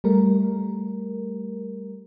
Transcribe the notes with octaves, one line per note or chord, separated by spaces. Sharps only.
G3 A3 A#4